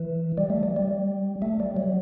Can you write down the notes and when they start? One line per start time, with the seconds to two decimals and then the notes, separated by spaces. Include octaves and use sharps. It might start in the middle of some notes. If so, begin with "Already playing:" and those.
Already playing: E3
0.38 G3
0.50 A3
0.63 G3
0.76 G3
1.42 A3
1.60 G3
1.77 F#3